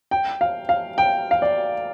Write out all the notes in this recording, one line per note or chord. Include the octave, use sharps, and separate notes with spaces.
G5
F5
F5
G5
F5
D5